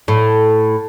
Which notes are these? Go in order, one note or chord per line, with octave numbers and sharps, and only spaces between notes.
A2